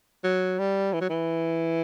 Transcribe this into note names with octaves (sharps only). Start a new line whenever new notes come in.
F#3
G3
E3
F#3
E3